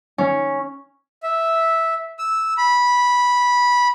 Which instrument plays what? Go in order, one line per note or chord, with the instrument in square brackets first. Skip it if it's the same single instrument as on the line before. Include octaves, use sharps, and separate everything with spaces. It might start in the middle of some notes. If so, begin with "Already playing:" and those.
[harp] C#4
[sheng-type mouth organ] E5
E6
B5